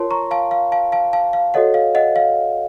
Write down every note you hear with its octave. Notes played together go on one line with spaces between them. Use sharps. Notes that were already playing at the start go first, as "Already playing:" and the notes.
Already playing: F4 A#4 C#5 A5 C6
A#5 C#6
F5 A5
F5
F5 A5
F5 A5
F5 A5
F5
F#4 A4 C#5 D#5 F#5
F5
D#5 F#5
F5